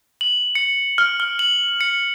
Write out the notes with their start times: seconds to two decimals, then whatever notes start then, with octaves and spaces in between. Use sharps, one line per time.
0.21 F#7
0.55 C#7
0.98 F6
1.20 F6
1.39 F#7
1.81 C#7